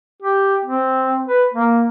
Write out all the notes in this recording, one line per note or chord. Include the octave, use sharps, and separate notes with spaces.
G4
C4
B4
A#3